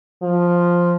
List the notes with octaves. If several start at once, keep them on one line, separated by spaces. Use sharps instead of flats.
F3